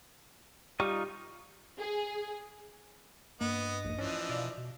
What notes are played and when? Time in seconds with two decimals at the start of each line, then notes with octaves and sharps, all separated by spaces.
0.80 G3 D#4 F4 C#6
1.78 G#4
3.41 G2 A#3 B3 D#5
3.84 A#1 D#2
3.98 E3 F3 C#4 D4
4.29 B2 D5 E5 F5
4.58 B2